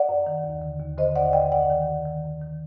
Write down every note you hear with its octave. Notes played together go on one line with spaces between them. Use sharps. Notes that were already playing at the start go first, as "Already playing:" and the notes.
Already playing: D5 F#5
F#2
D#3
D#2
D3
D#2
D3 C5 D#5
D#2 D5 F#5
D3 D#5 G5
F#2 D5 F#5
D#3
F#2
D#3
F#2
D#3